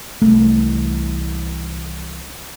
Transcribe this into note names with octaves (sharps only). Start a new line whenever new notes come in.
C2 E3 A3